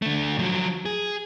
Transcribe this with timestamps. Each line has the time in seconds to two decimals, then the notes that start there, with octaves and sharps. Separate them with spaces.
0.02 D3 A3
0.39 F3 F#3
0.85 G#4